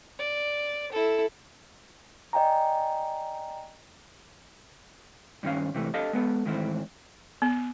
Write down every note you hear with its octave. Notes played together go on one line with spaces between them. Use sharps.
D5
E4 A4
D5 D#5 G5 G#5 A#5
G2 D#3 F3 C#4 F5
C3 E3 A3
D4 G4 A4 D#5 F5 A5
G#3 B3 A4
G#2 D#3 E3 A3 C4
B3